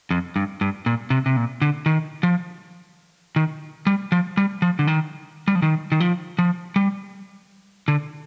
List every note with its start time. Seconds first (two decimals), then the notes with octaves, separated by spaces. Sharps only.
0.11 F2
0.36 G2
0.61 G2
0.86 A#2
1.10 C3
1.26 C3
1.37 A#2
1.62 D3
1.86 D#3
2.23 F3
3.36 D#3
3.87 G3
4.12 F3
4.37 G3
4.62 F3
4.79 D3
4.87 D#3
5.48 G3
5.55 F3
5.62 D#3
5.92 D#3
6.00 F3
6.39 F3
6.76 G3
7.88 D3